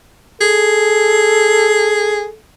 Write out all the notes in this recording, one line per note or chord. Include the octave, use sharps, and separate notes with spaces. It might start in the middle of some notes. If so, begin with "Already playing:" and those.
G#4 A4